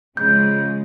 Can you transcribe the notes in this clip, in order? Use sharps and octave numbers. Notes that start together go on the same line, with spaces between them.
C#3 F3 G#3 G6